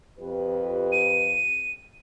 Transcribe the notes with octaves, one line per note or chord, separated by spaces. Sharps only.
F2 G4 B4
D#7